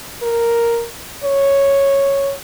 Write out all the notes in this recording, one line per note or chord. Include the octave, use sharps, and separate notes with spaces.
A#4
C#5